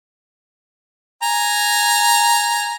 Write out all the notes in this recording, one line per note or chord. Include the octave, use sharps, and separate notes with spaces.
G#5 A#5